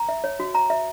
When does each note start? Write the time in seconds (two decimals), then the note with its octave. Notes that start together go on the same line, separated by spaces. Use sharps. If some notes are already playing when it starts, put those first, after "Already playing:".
Already playing: A#5
0.09 E5
0.24 C#5
0.40 F#4
0.55 A#5
0.70 E5